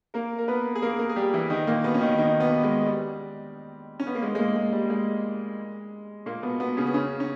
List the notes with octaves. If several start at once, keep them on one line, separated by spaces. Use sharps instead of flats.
A#3 A#4
A#4
B3 B4
G#4
A#3 A#4
A#3 A#4
G#4
G3 G4
E3 E4
D#3 D#4
A#2 A#3
B2 B3
C#4
D#3 D#4
D#3 D#4
B2 B3
G#3
G3
C#4
B3
A#3
G#3
G#3
A#2 A#3
G#3
G3
G#3
A#2 A#3
B2 B3
B2 B3
C#3 C#4
B3
C#3 C#4
C#4